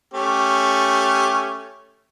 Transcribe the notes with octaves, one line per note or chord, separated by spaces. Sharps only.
A3 C#4 G4